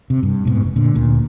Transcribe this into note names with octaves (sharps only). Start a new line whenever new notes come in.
C3
G2
G#2 B2
F1
A#2 D3
D2 A#2